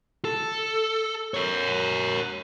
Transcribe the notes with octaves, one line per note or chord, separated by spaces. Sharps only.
A4
A#4 C#5